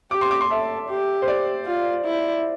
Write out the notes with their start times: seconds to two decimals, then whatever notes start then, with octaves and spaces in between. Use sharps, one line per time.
0.11 G4 D6
0.21 C6
0.31 D6
0.41 C6
0.50 A4 E5
0.89 G4
1.22 C5
1.28 D5
1.66 F4
2.05 E4